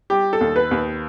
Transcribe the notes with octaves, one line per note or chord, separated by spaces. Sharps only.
G3 G4
A4
D#2
B4
D#2